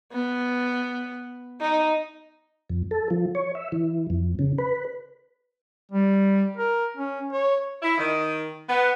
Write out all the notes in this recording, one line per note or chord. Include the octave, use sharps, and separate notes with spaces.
B3
D#4
F2
A4
F3
C#5
E5
E3
F2
C#3
B4
G3
A#4
C#4
C#5
E4
D#3
B3